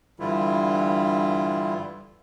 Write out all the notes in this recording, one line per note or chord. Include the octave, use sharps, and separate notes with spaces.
G2 D3 E3 G3 E4 F4